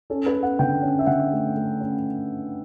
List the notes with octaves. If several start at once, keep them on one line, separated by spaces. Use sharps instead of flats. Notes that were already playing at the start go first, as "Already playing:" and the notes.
C#4 A4
B4
C#4
F#5
D3 G5
C#4
E5
D3 F#5
A3
A3
C#4